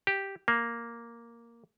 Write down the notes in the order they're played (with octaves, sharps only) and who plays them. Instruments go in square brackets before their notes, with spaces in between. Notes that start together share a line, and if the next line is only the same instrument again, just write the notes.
[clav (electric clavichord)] G4
A#3